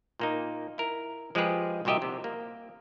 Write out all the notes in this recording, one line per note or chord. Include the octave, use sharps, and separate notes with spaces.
A#2 A#3 D#4
E4 A#4
F3 G#3 F4 G4 G#4 B4
C2 A#2 F#4 G4 D#5 E5
C3
A#3